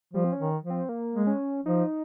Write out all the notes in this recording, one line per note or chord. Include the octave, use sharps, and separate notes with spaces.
F3 G3
C4
C#4
D#3
F3
C4
A#3
G#3
C#4
F3 D#4